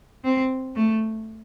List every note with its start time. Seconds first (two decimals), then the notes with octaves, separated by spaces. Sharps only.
0.24 C4
0.76 A3